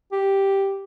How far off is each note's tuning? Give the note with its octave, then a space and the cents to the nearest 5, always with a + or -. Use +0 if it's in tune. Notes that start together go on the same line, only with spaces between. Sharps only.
G4 +0